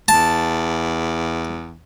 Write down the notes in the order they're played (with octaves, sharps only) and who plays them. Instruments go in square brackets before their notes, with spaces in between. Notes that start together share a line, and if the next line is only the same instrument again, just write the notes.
[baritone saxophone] E2 [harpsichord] A5